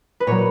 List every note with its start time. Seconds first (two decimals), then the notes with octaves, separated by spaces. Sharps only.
0.20 B4
0.27 A#2 F#3 C#5